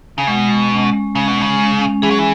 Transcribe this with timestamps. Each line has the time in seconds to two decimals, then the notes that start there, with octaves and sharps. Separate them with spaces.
0.18 C#3
0.27 B2 G#3
0.49 G#3
0.71 C#4
0.93 G#3
1.15 C#3 G#3
1.28 B2
1.38 C#3 G#3
1.59 G#3
1.81 C#4
2.02 E3 G#4
2.11 F#3
2.19 E3